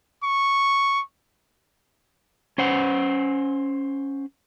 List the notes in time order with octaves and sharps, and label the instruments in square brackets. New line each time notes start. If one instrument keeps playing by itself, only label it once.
[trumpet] C#6
[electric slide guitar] C#4 C5 F#5